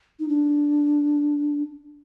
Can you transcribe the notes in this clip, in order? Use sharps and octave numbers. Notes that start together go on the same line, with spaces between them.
D#4
D4